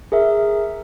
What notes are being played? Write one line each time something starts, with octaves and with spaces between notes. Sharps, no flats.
G#4 A#4 E5